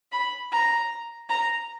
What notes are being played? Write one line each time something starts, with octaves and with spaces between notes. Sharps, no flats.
B5
A#5
A#5